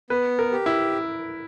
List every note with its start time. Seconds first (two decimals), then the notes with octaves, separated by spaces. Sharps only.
0.10 B3 B4
0.39 A#4
0.52 G4
0.66 E4